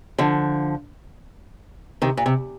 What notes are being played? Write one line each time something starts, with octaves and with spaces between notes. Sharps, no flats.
D3 F3
C3 D#3
A#2
C3